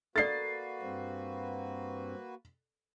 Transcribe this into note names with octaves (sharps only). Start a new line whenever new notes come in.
A#3 F#4 A4 B4 D5 A6 C7
G2 C4